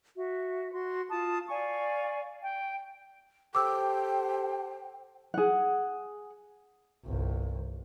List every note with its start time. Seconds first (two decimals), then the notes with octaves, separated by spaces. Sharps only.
0.16 F#4 E5
0.73 F#4 C6
1.11 F4 A5 D#6
1.49 D5 F5 G#5 C#6
2.42 G5
3.55 G4 A4 C5 G5 D6 E6
5.34 G#4 F#5
7.05 G1 C2